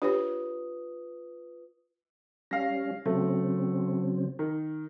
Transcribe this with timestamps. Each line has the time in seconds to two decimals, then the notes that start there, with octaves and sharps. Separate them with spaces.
0.02 D4 F4 G4 B4 C#5 D#6
2.51 G3 C#4 F5 A#6
3.06 C#3 F#3 A3 C4
4.39 D#3